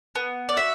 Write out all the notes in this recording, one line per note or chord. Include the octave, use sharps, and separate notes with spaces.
B3
D5
F#4 E5